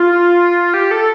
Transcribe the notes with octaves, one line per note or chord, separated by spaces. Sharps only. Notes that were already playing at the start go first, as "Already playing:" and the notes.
Already playing: F4
G4
A4